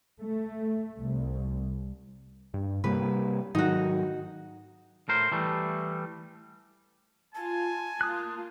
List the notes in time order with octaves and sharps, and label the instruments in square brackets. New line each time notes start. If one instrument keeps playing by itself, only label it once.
[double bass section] A3
C2
[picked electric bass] G2
[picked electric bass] C3 G3 A#3 [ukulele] B4
[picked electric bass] G#2 D#3 F#3 [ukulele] D#4 F#4
[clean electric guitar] A2 A#4 C5
E3 G3 A3
[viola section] F4 [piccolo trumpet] G#5 [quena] A5
[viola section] A#3 F4 [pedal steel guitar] D#6 F#6